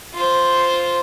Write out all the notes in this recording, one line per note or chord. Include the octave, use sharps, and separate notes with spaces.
F4 C5